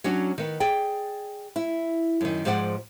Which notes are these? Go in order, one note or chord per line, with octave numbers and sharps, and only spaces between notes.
F#3 C#4 D4 F#4
D#3 B3
G#4 D5 G5
E4
F#2 D#3
G#2 F3 G#4 D5 F#5